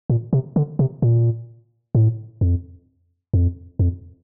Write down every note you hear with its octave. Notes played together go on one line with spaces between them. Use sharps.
A#2
C3
D3
C3
A#2
A2
F2
F2
F2